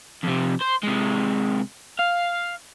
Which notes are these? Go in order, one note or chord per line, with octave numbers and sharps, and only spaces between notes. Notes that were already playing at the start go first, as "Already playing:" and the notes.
F2 C3
C5
C3 G#3
F5